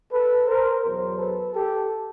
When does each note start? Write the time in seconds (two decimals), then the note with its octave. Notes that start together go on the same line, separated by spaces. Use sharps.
0.12 A4 B4
0.48 A#4 C5
0.83 E2 B2 F#3 A#4 C5
1.18 A4 B4
1.53 G4 A4